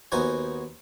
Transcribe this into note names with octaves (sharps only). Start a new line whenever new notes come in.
D#2 B3 D#4 F#4 C5 G#5